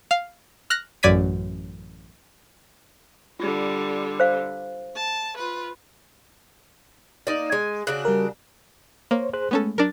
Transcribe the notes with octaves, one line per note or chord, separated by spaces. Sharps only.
F5
F6 F#6 A#6
A1 F#2 D5 G#6 B6 D#7
D3 G3 F4
C5 F5
A5
F4 B4
A#3 D#4 D5
G#3 G#5
C#3 D4 F#4 F#6
G3 A#4
A#3 C5 C#5
G#4 C5 F#6
G#3 A3 B3 C#4 A4
F#3 D4 A#4 A6